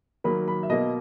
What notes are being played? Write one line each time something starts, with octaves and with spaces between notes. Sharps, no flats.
D#3 F#3 A#3 B5
B5
E5
B2 A#3 D#5